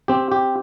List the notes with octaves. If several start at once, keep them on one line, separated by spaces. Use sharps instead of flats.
C4 G4
G4